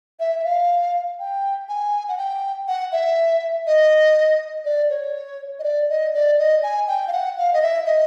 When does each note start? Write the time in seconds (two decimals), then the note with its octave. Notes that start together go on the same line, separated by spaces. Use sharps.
0.20 E5
0.39 E5
0.45 F5
1.19 G5
1.69 G#5
2.08 F#5
2.18 G5
2.68 F#5
2.92 E5
3.67 D#5
4.65 D5
4.90 C#5
5.59 D#5
5.64 D5
5.90 D#5
6.14 D5
6.38 D#5
6.63 G#5
6.88 G5
7.08 F5
7.13 F#5
7.38 F5
7.53 D#5
7.62 E5
7.86 D#5